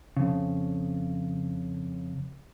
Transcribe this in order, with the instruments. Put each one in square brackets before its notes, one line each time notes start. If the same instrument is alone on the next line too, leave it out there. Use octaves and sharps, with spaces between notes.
[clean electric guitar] F2 C#3